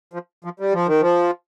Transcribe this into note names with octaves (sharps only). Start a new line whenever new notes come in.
F3
F3
G3
F3
D#3
F3